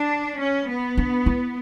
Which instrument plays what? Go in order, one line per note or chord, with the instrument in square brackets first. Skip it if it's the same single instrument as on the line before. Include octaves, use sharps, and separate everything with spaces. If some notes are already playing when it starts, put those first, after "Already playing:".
Already playing: [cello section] D4
C#4
B3
[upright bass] D4
E4